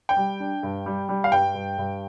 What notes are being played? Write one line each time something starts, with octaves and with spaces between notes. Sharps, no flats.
G5
G3
D4
G2
G3
G3
F5
G2 G5
G2
G2